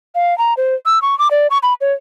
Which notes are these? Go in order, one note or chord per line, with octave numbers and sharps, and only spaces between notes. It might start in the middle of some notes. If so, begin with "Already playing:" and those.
F5
A#5
C5
E6
C#6
D6
D5
C#6
B5
C#5